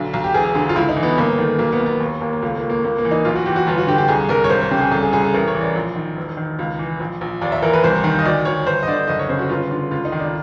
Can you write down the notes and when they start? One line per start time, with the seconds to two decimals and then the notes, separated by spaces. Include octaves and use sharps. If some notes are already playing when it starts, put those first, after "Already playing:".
Already playing: B1 D3
0.14 B1
0.24 G4
0.34 E1 G#4
0.55 D3 G#4
0.69 F4
0.76 C#2 E4
0.89 D#4
0.96 E3
1.03 B3
1.18 G1 A#3
1.38 D#3 A3
1.59 B1 A#3
1.72 B3
1.80 B1
1.86 B3
2.00 D#2
2.21 D#2 A#3
2.33 A#3
2.42 C#2 A3
2.57 A#3
2.62 C#2
2.69 A#3
2.84 C#2 A#3
2.98 A#3
3.05 E3
3.11 D#4
3.25 B1 F4
3.36 F#4
3.46 E3 G4
3.56 F#4
3.67 G1 F4
3.78 F#4
3.87 D3 G4
3.98 G4
4.08 C2 G#4
4.29 C2 A#4
4.44 C#5
4.50 G#1 C5
4.61 C#5
4.71 C#3 G4
4.81 G#4
4.91 C2 A4
5.02 G#4
5.13 C2 G#4
5.23 A4
5.34 A1 A#4
5.48 C#5
5.55 E3
5.61 D5
5.75 A#1
5.96 D#3
6.17 E1
6.37 D#3
6.59 C#2
6.79 E3
7.00 A#1
7.21 A#1
7.41 D#2 D5
7.52 E5
7.62 E3 A#4
7.73 B4
7.84 C2 C5
8.04 D#3
8.19 D#5
8.25 D2 D5
8.45 D2 C#5
8.66 G1 C5
8.83 D#5
8.87 D3 D5
9.08 F#1 D#5
9.19 C#5
9.29 C#3 C5
9.39 F#4
9.49 G1 F4
9.71 D3 F4
9.91 C#2 F4
10.05 D#4
10.12 D#3
10.20 D4
10.26 D#4